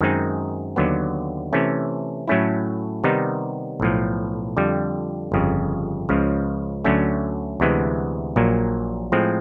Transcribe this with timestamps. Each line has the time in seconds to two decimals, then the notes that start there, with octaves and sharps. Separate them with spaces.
0.01 F#2 D#3 G#3 C4 D#4
0.76 D#2 D3 F#3 B3
1.53 C3 E3 A3 C#4
2.28 A2 F#3 A3 C#4 E4
3.04 C3 D#3 G3 B3 D#4
3.80 B1 A2 F3
4.57 F2 D3 G3
5.32 G1 F2 C#3
6.09 C#2 C#3 F3
6.84 D2 D3 F#3 A3 C#4
7.60 D2 C3 E3 G#3 B3
8.36 A#1 A#2 F#3 A#3
9.12 A2 F3 G#3 C4